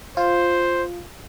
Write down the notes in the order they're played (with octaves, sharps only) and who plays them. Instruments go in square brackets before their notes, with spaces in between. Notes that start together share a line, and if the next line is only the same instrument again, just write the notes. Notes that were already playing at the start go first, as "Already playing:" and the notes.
[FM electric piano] F4 [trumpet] C5